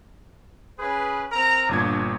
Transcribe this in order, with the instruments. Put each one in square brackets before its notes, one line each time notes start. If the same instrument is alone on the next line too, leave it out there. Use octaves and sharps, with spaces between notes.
[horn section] C#4 G#4 B4
C4 A#4 A#5
[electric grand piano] G1 A#2 G#6 [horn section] D4